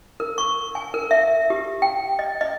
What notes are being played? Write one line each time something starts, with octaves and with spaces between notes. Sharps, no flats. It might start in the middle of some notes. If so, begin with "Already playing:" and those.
A#4
C#6
G#5
A#4
E5
G4
G5
D#5
D#5